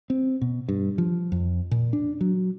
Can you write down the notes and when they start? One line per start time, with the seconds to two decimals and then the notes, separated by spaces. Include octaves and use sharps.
0.10 C4
0.41 B2
0.69 G2
0.98 F3
1.32 F2
1.71 A#2
1.93 D4
2.21 F#3